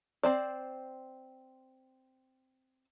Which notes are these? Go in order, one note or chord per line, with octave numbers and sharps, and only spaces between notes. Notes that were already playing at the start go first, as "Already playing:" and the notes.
C4 C5 D5